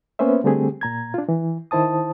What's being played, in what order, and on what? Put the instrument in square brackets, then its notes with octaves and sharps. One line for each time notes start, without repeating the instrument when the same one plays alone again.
[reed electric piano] A#3 B3 C#4 B4 C5 E5
D3 G3 A3 C4 G4 G#4
A#2 A#5 G#6
D4 F4
E3
D#3 E4 C5 A5 D#6